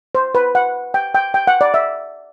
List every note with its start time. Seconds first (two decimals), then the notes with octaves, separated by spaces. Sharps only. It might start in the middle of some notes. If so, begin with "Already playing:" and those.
0.15 C5
0.35 B4
0.55 F#5
0.94 G5
1.15 G5
1.34 G5
1.47 F#5
1.61 D5
1.74 E5